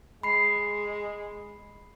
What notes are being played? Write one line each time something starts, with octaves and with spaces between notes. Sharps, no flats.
G#3 B5 C7